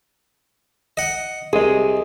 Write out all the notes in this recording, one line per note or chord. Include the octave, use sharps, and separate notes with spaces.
D#5 F#5
C2 G#4 D#5